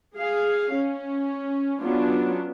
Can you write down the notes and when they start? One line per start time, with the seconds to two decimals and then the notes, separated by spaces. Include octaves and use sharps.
0.16 G#4 F5
0.74 C#4
1.81 F#3 B3 C#4 D4 F4